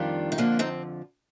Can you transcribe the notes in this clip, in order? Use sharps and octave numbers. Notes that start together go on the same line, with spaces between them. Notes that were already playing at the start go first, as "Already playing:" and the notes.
Already playing: F2 D#3 G3 D4 F4
D#4
F2 D3 F3 A#3 D4
C4 D#4